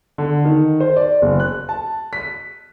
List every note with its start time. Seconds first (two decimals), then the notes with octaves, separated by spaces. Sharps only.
0.18 D3
0.45 D#3
0.80 C5
0.96 D5
1.22 F#1
1.40 F#6
1.69 A5
2.13 B6